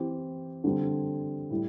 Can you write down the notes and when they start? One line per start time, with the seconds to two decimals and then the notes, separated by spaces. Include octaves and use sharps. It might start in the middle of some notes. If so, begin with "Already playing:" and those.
Already playing: E3 C4 G4
0.64 D3 G3 C4
1.50 A2 G3